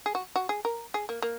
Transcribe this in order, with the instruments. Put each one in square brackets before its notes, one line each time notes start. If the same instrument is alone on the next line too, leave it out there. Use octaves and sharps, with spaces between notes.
[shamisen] G#4
F#4
F#4
G#4
A#4
G#4
A#3
A#3